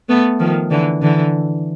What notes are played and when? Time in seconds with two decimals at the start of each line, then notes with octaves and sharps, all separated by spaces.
0.09 A3 B3
0.39 D#3 F3
0.70 D3 E3
1.02 D3 E3